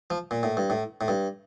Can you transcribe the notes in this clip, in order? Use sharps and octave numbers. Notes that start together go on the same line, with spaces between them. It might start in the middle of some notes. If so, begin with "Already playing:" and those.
F3
A#2
A2
G2
A2
A2
G2